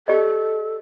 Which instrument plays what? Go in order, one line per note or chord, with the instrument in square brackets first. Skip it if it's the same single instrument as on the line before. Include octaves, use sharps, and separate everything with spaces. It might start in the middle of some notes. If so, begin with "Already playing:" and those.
[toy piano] G4 D5 D#5 [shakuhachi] A4